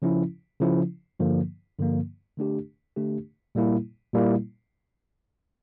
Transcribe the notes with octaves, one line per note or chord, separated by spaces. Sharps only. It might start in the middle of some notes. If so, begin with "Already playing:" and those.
C#3 F3 C#4 E4
C#3 F3 C#4 E4
G2 D3 F3 A#3
G2 D3 F3 A#3
D3 A3 D4 G4
D3 A3 D4 G4
A#2 G3 A#3 E4
A#2 G3 A#3 E4